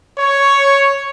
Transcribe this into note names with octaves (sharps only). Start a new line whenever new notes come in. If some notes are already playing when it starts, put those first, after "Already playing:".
C#5